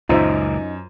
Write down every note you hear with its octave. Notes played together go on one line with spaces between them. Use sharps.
C#2 F#2 A#2 D#4 F4 C5 E5